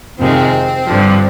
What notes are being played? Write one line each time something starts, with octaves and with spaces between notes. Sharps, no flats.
F2 C3 D#3 G#3 C4
G2 D3 F3